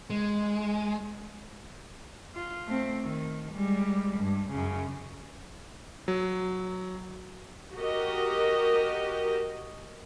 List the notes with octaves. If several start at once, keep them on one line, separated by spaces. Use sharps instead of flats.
G#3
F4
A3 C4
D#3
G3 G#3
G2
F#2 C#3
F#3
F#4 G4 A#4 D#5